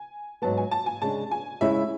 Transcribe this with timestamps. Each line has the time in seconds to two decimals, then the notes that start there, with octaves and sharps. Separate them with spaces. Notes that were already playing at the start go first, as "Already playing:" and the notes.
Already playing: G#5
0.42 G#2 F#3 B3 A5
0.57 G#5
0.71 A5
0.86 G#5
1.02 C#3 G#3 D4 A5
1.31 G#5
1.61 C#3 G#3 C#4 E4 E5